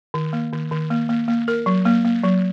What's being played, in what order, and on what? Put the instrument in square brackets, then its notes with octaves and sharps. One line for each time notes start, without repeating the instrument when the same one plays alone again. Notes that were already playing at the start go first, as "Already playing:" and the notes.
[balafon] D#3
A#3
D#3
D#3
A#3
A#3
A#3
A#4
F#3
A#3
A#3
F#3